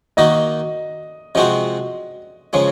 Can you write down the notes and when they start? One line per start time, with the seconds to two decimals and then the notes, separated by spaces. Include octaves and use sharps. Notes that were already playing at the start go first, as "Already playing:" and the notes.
0.17 D#3 A#3 D#4 F#4 D#5
1.35 C3 F3 G#3 C4 F#4 D#5
2.53 C#3 F3 G#3 C#5